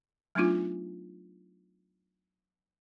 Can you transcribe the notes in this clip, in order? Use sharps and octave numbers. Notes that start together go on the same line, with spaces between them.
F#3 A3 B3 D4 D#4 F4